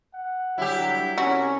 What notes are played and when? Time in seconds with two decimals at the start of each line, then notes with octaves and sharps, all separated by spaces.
0.14 F#5
0.58 D3 F#3 G3 E4 G4
1.18 C2 C#4 F#4 A#5